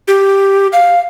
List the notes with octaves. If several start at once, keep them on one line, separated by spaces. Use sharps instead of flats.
G4
F5